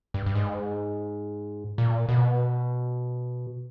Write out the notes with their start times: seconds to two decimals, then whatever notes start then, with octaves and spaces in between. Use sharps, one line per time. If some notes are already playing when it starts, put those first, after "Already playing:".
0.14 G2
0.26 G2
0.35 G#2
1.78 A#2
2.09 B2